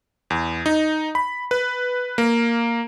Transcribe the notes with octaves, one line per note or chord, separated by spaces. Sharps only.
E2
D#4
B5
B4
A#3